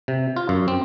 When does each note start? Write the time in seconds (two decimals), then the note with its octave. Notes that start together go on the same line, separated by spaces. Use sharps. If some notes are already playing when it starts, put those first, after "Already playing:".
0.08 C3
0.36 F4
0.49 F#2
0.68 C4